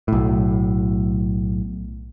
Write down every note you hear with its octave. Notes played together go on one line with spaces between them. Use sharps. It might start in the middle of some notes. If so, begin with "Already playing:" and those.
B1 A2